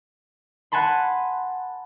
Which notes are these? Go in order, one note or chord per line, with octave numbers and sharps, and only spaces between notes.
F#5 G#5 A5 B5 C6